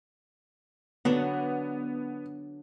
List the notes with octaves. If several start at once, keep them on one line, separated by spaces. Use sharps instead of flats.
D3 F#3 B3 D4